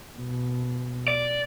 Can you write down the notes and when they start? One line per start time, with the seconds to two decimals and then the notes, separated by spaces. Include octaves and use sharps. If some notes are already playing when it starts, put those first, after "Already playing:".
0.17 B2
1.08 D5